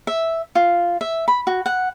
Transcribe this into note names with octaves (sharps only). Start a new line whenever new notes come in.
E5
F4
E5
B5
F#4
F#5